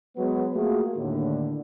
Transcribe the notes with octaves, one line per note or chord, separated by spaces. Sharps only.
F#3 G#3 B3
A3 A#3 F4 F#4 G#4
D#2 A2 D3